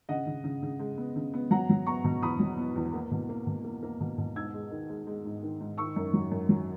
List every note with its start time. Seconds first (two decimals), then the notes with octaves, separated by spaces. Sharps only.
0.09 C#3 D#5 F#5
0.26 C#3
0.44 C#3
0.62 C#3
0.80 G#3
0.98 B3
1.16 C#3
1.34 B3
1.51 F#3 F#5 A#5
1.69 F#3
1.87 B3 A#5 C#6
2.04 B2
2.22 E2 B5 D#6
2.39 F#3
2.58 B3
2.76 E2
2.94 A#3
3.11 B2
3.29 A#3
3.47 B2
3.64 A#3
3.83 A#3
4.00 B2
4.18 B2
4.36 G#2 E6 G#6
4.54 G#3
4.71 D#3
4.89 G#3
5.07 G#3
5.25 G#2
5.43 D#3
5.60 G#2
5.78 D#3 C#6 E6
5.96 F#2
6.13 F#3
6.31 F#2
6.49 F#3